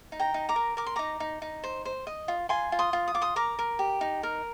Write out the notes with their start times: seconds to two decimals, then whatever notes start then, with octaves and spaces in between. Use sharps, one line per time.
0.12 D#4
0.20 G5 A#5
0.34 D#4
0.49 A#5 D6
0.56 A#4
0.77 A#4 D6
0.86 C6
0.96 D#4 A#5 D6
1.20 D#4
1.42 D#4
1.64 C5
1.85 C5
2.07 D#5
2.28 F4
2.49 F4 G#5 C6
2.72 F4
2.79 C6 D#6
2.93 F4
3.08 D#6
3.14 F4 D6
3.22 C6 D#6
3.36 A#4 A#5 D6
3.59 A#4
3.79 G4
4.01 D#4
4.23 A#4